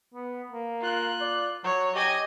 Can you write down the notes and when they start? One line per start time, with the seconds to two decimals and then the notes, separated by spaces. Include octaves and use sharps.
0.14 B3
0.51 A#3
0.81 F4 F#6
1.21 D5
1.64 F#3 C#5
1.95 G4 D#5 G#5